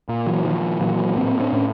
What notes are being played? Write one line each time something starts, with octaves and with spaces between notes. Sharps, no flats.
A#2
E3 F#3
A#2 D#3 F3
A#2 E3 F#3
A2 A#3 C4
C4 D4
A2 C#4